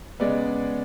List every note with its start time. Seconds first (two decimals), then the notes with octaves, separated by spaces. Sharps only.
0.20 C#3 G#3 B3 D5